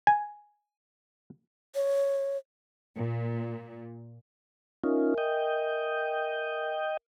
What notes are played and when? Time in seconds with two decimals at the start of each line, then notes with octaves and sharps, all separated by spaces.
0.07 G#5
1.75 C#5
2.96 A#2
4.84 C#4 D#4 F4 A#4 E5 G#5
5.18 D#5 G5